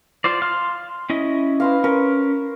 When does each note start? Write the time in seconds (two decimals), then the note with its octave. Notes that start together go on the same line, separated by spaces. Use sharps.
0.24 F4 C5 D5
0.42 F5 C6 F6
1.10 C#4 E4 D#5
1.60 B4 C5 F5
1.84 C#4 A#4